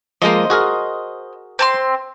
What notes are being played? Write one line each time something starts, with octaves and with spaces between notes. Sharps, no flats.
F3 G#3 A#3 C5 D#5
F#4 G#4 A#4
C4 A5 C6